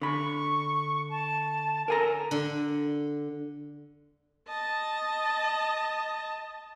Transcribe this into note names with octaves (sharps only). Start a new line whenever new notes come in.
D3 B5 C#6
A5
A4 A#4 G#5 A#5
D3
D#5 A5